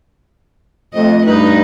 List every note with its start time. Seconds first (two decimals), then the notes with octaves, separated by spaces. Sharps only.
0.94 F2 A3 D#5
1.25 G2 D#4 B4